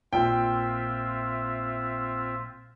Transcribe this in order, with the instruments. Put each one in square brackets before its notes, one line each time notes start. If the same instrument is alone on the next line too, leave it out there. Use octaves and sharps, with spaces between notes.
[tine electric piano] A#1 A#2 [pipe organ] C4 F4 E5 [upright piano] G5